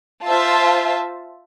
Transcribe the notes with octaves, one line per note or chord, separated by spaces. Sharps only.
F4 C5 E5 A5